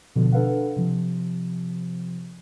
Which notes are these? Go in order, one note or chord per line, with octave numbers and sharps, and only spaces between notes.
B2 D3 F3
D4 A4 B4 F5 F#5
C3 F3